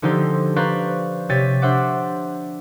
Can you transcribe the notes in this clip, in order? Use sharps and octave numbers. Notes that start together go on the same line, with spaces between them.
D3 F3 D#4 G4 A4 C5
B4 C5 D5 F5 A#5 C#6
C3 G4 C#5 A6 B6 D#7
D4 C5 E5 F#5 D6